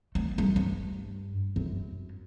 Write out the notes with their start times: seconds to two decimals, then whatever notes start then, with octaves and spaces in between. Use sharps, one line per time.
0.15 A3
0.38 G3
0.56 G2
1.56 F#2